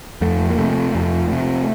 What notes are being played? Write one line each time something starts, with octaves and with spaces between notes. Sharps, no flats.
F2 A3
A#3
C3 A3
F2
C3